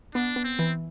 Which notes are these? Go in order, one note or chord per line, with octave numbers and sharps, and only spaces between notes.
B3 D4
B3
C4
E3